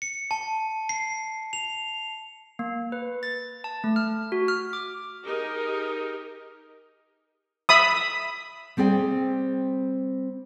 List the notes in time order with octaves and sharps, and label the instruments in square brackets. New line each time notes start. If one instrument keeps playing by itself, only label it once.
[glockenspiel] C#7
A5
C7
F7
[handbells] A#3
B4
A6
A5
A3
F6
F#4
F6
D6
[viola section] D#4 G4 G#4 A#4
[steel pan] E5 B5 D#6
[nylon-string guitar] G3 C4 G#4 D5 G5